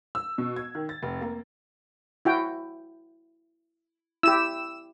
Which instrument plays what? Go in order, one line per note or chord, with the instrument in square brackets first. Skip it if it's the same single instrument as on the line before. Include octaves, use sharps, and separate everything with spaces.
[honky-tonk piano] E6
B2
G#6
D#3
A6
F1
A#3
[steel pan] E4 F#4 G5
[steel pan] E4 G4 [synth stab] E6 E7